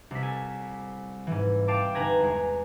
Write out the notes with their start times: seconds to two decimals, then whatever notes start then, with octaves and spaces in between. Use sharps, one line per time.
0.11 C2 B6
0.22 A4 G#5
1.27 G#2 E3
1.68 F5 G5 A5 D6
1.95 G1 D#4 B4 G#5 A#5 G#6
2.20 E2 G#3